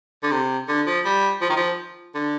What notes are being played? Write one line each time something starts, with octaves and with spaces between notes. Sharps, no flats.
D3
C3
D3
F3
G3
F3
D#3
F3
D3